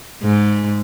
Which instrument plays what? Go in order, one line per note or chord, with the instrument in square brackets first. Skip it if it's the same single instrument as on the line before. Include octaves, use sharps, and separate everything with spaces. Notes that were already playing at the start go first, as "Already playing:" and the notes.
[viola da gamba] G#2